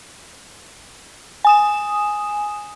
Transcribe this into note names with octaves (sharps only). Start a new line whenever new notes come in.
G#5 D#6 E7